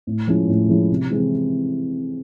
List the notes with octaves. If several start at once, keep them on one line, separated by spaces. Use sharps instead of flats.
A2
F3 G#3 C#4 E4
A2
F3 G#3 C#4 E4
C3
E3 G#3 C4 E4